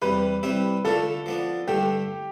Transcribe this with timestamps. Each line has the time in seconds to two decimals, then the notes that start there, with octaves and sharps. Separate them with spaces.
0.02 E2 C3 G3 B4
0.43 C3 G3 C4 E4
0.85 D3 A3 D4 F4 A4
1.26 F3 B3 D4
1.68 G2 D3 A3 G4